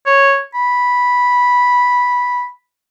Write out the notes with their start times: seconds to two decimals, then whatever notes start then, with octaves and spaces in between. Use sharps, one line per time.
0.06 C#5
0.54 B5